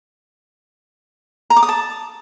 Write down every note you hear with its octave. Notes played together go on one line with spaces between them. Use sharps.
A#5
D6
D#6
A5